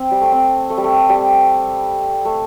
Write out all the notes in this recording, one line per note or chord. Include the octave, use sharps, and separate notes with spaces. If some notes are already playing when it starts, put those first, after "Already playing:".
Already playing: C4
G3
A3
C4
A3
G3
A3
G3
A3